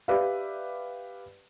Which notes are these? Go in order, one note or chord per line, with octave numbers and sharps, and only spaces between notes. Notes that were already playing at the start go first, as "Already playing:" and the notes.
G4 B4 D5 E5 F5